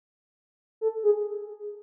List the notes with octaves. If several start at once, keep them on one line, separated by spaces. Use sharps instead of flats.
A4
G#4